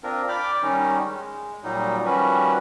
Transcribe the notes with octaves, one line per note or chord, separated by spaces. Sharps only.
C4 D4 F4 A#4
D5 G5 B5 D6 F6
D#3 G3 C#4 D#4
G#3
A#2 F#3 G3 D#4
D#3 F3 G3 C#4 F#4 B4